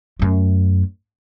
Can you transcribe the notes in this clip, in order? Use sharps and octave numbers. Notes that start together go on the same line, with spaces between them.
F#2 A3